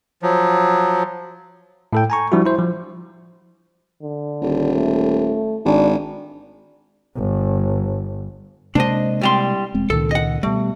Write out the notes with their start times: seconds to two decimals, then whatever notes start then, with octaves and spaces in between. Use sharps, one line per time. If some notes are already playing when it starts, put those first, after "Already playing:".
0.22 F3 F#3
1.93 A2 A4 G5
2.10 G#5 A#5 C#6
2.32 F3 G3 D4 E4 F#4
2.46 E4 C5
2.59 F3
4.03 D3
4.41 D#1
4.74 A3
5.65 G#1 D4
7.17 G1
8.75 C3 G#3 A#3 D4 C5 D#5
9.21 C2 G3 C6
9.74 E1 G#3 C4
9.90 C#2 A#2 D#3 A4
10.11 D#5 F#5
10.43 B2 G3 A3